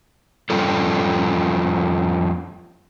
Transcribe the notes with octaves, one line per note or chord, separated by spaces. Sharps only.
F2 G3 C#4 F4 A4